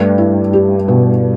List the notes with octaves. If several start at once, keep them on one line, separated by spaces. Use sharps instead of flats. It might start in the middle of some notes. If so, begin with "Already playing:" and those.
Already playing: G2 A3
E4
G4
B2